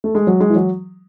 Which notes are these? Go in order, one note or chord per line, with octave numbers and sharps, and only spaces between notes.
A3
G#3
F#3
G#3
E3
F#3